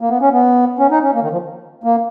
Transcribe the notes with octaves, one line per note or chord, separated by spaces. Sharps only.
A#3
B3
C#4
B3
C#4
D#4
C#4
A#3
D#3
F3
A#3